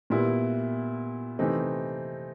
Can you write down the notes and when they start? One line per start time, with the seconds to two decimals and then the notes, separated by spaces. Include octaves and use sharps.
0.10 A#2 G3 B3 E4
1.39 C3 E3 A3 C4 D#4